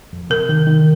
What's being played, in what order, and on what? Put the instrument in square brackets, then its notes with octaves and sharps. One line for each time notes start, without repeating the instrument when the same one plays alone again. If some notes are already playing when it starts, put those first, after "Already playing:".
[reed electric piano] F2
[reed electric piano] C3 [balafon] A#4
[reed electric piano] D#3
D#3